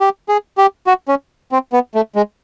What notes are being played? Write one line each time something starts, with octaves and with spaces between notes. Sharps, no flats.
G4
G#4
G4
F#4
C#4
C4
B3
A3
G#3